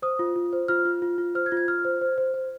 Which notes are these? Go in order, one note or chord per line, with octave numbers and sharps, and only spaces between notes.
C5 D#6
F4
F4
C5
F4 F6
F4
F4
F4
C5 F6
G#6
F4
G#6
F4 F6
C5
C5
C5
C5